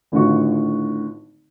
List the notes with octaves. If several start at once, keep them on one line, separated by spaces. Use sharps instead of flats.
G#1 A2 D3 F4 F#4 C#6